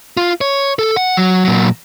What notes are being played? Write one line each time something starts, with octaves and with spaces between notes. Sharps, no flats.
F4
C#5
A4
F#5
F#3
A#2 F#3